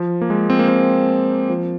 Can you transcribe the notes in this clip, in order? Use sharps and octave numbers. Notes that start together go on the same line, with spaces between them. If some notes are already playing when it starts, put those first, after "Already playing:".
Already playing: F3
A#3
G#3
C4
A#3
C4
F3